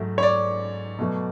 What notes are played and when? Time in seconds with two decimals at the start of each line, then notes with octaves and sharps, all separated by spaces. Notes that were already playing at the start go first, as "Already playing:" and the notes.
Already playing: G#2 F#3 A3
0.18 C#5
0.23 D5
0.99 B2 F#3 A3